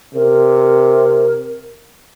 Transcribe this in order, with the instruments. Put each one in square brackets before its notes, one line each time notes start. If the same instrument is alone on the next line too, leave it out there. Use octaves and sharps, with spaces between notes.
[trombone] C3 [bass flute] A#4